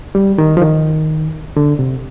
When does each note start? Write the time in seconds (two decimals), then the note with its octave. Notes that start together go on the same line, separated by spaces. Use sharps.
0.15 G3
0.38 D#3
0.57 F3
0.62 D#3
1.57 D3
1.79 C3